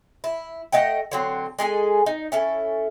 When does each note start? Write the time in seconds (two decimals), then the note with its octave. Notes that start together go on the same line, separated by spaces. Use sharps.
0.24 E4
0.72 A3 D#5 F#5 G5
1.12 D3 F#3 C4
1.59 G#3 G#4 A4 G#5
2.06 D#4
2.32 C#4 E4 A4